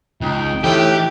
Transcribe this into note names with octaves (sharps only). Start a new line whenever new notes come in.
C#2 D#4 G5
D2 A2 E3 G4